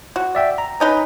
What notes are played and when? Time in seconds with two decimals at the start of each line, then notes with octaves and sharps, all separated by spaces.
0.16 F#4
0.35 D5 E5 G5
0.58 A#5
0.80 C#4 D#4 B4